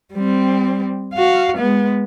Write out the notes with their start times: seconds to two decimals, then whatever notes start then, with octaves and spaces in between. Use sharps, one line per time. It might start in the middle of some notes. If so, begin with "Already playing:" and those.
0.13 G3 C4
1.14 F#4 F5
1.58 G#3 B3